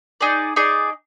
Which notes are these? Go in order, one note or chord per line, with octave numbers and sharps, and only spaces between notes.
D#4 G#4 D5
D#4 G#4 D5